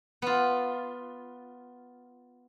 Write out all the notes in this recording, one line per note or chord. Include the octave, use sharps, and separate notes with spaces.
B3 F4